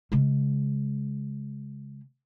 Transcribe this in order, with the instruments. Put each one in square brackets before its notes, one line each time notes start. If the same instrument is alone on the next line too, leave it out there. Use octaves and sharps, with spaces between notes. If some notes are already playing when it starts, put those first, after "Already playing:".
[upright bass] C#3 G#3